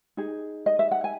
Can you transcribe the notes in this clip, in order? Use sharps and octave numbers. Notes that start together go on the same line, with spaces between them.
D#4 G#4
D#5
E5
F#5
G#5